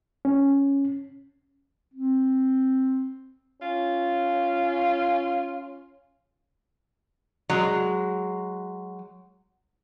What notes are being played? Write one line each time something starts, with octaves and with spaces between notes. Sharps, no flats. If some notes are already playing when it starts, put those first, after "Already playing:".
C#4
C4
C#4 F4
F#3 G#3